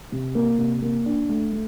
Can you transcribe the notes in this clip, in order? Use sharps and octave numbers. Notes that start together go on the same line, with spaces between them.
C3
A#3
C3
A#3
D4
A3
A3